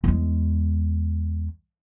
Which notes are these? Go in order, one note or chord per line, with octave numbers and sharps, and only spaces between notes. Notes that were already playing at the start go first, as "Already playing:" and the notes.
E2 G#3